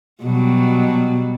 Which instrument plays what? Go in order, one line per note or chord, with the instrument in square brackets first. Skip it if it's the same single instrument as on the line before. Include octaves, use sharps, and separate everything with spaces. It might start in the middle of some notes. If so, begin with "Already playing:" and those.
[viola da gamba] B2 F#3 G3